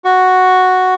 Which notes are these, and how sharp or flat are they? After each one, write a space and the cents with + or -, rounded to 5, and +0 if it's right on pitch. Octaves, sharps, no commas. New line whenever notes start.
F#4 +0 C#6 +0